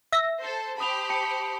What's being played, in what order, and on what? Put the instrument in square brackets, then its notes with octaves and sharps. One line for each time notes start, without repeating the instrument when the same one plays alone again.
[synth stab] E5 A#6
[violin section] A4 C5
[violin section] G4 C5 B5 [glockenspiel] A5 D#6 F7
[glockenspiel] A5 C#7